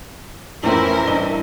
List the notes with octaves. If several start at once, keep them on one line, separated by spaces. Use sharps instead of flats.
F2 A2 E3 C#4 E4 A#4 C5 E5
G2 D#5 G7